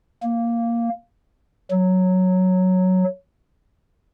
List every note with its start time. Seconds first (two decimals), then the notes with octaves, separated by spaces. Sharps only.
0.23 A#3
1.70 F#3